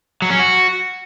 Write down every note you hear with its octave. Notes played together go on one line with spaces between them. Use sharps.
F#3
C#4
F#4